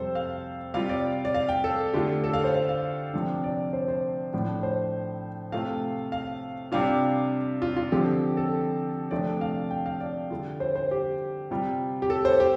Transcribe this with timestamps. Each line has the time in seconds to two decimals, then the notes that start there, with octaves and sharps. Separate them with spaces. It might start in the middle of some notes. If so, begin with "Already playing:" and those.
Already playing: F2 C3 G3 A4 C5
0.15 F5
0.74 C3 G3 F4 F5
0.89 D5
1.25 D5
1.34 F5
1.49 G5
1.64 A4
1.94 D3 A3 F4 G4
2.24 A4
2.33 F5
2.44 C5
2.54 F5
2.69 F5
3.14 C3 F3 D4
3.44 D5
3.73 C5
3.88 C5
4.33 A2 F3 D4
4.63 C5
5.52 C3 A3 F4 F5
6.12 F5
6.72 C3 G3 D4 F4 F5
7.62 F4
7.77 F4
7.92 D3 F3 C4 G4
8.37 A4
9.11 C3 F3 A3 D4 F4 D5
9.41 F5
9.70 G5
9.86 F5
10.00 D5
10.30 D3 G3 F4
10.60 C5
10.76 C5
10.91 G4
11.51 C3 G3 F4
12.02 G4
12.10 A4
12.25 C5
12.40 G4